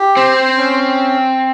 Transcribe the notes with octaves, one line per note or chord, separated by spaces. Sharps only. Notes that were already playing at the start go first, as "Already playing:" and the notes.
Already playing: G4
C4 C5
C#4